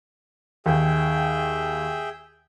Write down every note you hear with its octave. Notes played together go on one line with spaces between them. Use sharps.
D#2 G#4 E5 G5